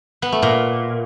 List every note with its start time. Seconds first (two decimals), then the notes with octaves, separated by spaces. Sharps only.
0.22 B3
0.32 A3
0.42 A#2